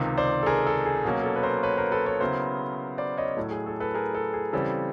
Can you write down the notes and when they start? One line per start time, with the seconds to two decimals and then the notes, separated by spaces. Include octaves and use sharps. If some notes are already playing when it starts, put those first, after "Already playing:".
Already playing: C#2 C3 D#3
0.17 C5 D5
0.43 A4
0.46 G#4 A#4
0.67 A4
0.86 G#4
1.05 B2 F#3 A#3 C#4
1.23 A4
1.36 B4
1.43 A#4 C5
1.63 B4 C#5
1.77 A#4 C5
1.92 A4 B4
2.06 B4 C#5
2.21 C#3 F#3 B3 E4 A#4 C5
2.98 C5 D5
3.17 C#5 D#5
3.37 A2 F#3 A3
3.51 G#4
3.66 A4
3.80 A4 B4
3.94 G#4 A#4
4.15 A4
4.33 G#4
4.53 C#3 E3 G3 C4 A4